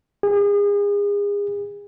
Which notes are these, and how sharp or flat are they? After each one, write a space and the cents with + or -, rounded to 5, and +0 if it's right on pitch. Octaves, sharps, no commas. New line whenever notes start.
G#4 -35